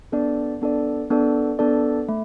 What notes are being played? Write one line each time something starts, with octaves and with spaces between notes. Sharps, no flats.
B3 D4 A4 D5
B3 D4 A4 D5
B3 D4 A4 D5
B3 D4 A4 D5
A3